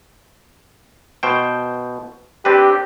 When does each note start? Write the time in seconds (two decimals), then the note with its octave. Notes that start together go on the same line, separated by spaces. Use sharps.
1.23 B2 C5 G5
2.45 C4 D4 G4 B4